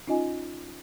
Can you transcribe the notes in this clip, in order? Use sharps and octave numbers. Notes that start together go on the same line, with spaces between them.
C#4 D#4 F4 D#5 G#5